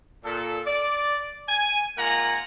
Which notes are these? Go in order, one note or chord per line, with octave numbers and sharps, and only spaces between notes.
A#2 A4
D5
G#5
G#2 A#3 F4 F#5 G#5 A#5